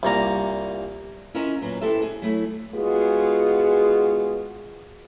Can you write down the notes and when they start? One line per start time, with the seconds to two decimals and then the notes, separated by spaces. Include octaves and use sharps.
0.03 C2 A#2 A#5
1.34 C#4 E4 F4 A#4 D#5 E5
1.61 A#2 F#3 B3
1.81 B3 E4 G4 A4 C5 E5
2.02 G#4
2.22 F#3 A3 E4
2.75 G#3 B3 F4 F#4 G#4